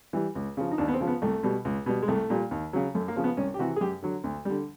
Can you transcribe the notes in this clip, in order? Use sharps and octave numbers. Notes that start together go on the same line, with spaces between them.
E3 G3
C#2
C#3 F3
D#4
D#2 D4
B3
C4
C#3 F3
B3
C2 A3
B2 G3
C#2
B2 G3
G#3
C2 A3
A#2 G3
D#2
C#3 F#3
F#2 A3
A#3
C#3 F3
B3
C2 C#4
G4
C3 E3 F#4
G#4
F#2 G4
D3 F#3
D2
D3 G3